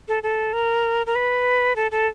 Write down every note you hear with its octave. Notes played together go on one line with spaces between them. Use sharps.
A4
A4
A#4
A#4
B4
A4
A4